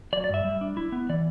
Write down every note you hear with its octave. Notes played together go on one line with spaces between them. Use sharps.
F#3 D5
D5
G2 E5
G3
D4
E4
B3
E3 D5